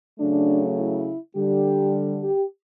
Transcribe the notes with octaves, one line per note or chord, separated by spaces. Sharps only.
C#3 F#3 A3 D4
E4
D3 G3 G4
G4